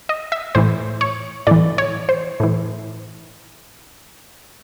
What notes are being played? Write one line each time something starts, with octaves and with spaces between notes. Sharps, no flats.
D#5
E5
A2 E3 C5
C#5
A2 E3 D5
C#5
C5
A2 E3